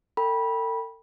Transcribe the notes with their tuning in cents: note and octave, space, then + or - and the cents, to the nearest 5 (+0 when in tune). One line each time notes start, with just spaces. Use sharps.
A4 +40 G5 +10 B5 -20